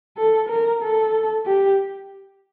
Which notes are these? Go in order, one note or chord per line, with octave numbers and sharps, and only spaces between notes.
A4
A#4
A4
G4